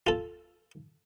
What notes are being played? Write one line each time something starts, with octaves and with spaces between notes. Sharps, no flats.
F4 A4